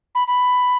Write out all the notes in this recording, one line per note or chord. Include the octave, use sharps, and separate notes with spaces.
B5
B5